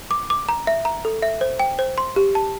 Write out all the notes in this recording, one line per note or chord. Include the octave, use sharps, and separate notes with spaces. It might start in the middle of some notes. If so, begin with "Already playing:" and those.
D6
D6
A#5
E5
A#5
A4
E5
C5
G5
C5
C6
G4
A5